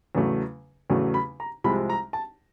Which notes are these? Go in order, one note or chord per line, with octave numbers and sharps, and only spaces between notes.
E2 C#3 F#3 A3
E2 C#3 F#3 A3
B5
A#5
C2 C3 F3 G#3 B5
A#5
A5